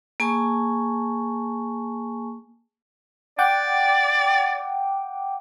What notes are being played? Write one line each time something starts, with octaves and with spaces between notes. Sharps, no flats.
A#3 G#4 G#5 A5 C#6
D5 F#5 G5 D6